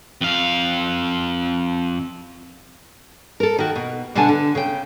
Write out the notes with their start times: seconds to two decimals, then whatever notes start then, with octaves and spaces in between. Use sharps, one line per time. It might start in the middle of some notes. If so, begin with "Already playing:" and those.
0.21 F2 F5
3.40 A4 A#4
3.58 D#3 F#4
3.76 B2
4.15 B2 D3 D4 F#5 G#5 A5
4.29 D3
4.55 C#3 G5